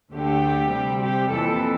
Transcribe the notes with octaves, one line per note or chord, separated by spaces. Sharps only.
D2 D3 A3 G4
C3 G3 C4
G4
F2 E3 A#3 A4